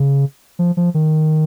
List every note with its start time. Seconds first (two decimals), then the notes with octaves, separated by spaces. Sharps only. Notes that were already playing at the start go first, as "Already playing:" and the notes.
Already playing: C#3
0.59 F3
0.77 F3
0.94 D#3